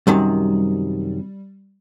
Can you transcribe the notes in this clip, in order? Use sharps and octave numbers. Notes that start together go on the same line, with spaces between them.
F#2 C3 D#3 G3